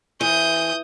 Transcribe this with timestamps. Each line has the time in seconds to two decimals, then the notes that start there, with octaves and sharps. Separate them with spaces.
0.21 E3 D#6 G6